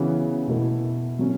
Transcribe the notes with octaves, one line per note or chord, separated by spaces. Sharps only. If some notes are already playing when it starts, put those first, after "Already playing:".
Already playing: C#3 E3 B3 F#4 C#5
B2 A3 E4
F#3 C#4